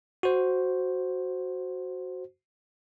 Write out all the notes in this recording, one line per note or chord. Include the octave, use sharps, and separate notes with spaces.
F#4 C5